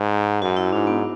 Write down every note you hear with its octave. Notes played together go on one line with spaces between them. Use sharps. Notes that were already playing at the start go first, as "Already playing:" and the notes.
Already playing: G#2
F#2 F#4
E4
G#2 D4
B3